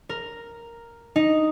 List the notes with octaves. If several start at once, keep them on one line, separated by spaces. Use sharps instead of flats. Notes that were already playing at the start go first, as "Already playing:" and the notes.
A#4
D#4